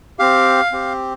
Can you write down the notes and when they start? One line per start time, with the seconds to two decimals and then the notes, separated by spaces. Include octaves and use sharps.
0.19 C4 G4 F5
0.72 C4 G4